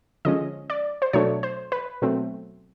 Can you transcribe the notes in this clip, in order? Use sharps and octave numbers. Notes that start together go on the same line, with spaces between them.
D3 F3 G#3 C#4 D#5
D5
C5
B2 F#3 A3 D4 C#5
C5
B4
B2 F#3 A3 C4